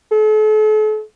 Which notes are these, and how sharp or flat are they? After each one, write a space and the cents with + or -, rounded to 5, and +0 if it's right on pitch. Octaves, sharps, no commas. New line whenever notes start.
A4 -40